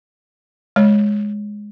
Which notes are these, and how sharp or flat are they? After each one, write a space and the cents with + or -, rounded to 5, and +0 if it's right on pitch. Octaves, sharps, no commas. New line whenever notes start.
G#3 +0 C#5 +0